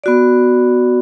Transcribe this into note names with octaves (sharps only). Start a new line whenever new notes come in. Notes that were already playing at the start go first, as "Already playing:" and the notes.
B3 F#4 D5